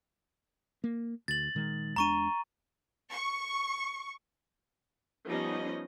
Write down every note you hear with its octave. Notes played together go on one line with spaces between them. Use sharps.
A#3
D2 A6 F#7
A#2 D#3 G#3
E2 G#3 D4 A#5 C#6 D#7
C#6
F3 G3 B3 C#4 D#4 D#5